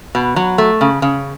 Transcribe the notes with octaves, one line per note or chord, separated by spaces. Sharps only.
B2
F#3
A3
C#3
C#3